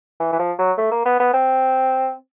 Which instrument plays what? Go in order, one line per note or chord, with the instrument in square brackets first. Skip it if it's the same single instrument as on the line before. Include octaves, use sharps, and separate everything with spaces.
[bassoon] E3
E3
F3
F#3
A3
A#3
B3
B3
C4